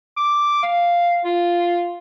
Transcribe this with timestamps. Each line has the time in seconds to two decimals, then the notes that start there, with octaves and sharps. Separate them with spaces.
0.17 D6
0.63 F5
1.24 F4